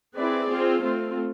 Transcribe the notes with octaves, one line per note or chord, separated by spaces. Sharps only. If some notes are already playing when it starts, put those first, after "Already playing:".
C4 E4 G#4 B4 D5
C4 F4 G#4 C5
A3 C4 F4